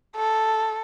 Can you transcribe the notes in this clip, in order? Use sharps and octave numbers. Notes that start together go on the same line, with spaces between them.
A4